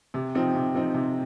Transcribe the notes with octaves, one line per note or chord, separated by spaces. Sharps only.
C3
F3 C4 D#4
C3
F3 C4 D#4
C3